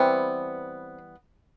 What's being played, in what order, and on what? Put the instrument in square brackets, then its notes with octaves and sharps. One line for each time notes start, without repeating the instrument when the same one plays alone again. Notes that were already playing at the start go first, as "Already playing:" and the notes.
Already playing: [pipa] E3 G3 B3 C4